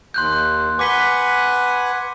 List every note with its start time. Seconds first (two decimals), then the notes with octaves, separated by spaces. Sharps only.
0.14 D#2 C6 F#6 G6
0.79 B4 F#5 G#5 D6 B6 G7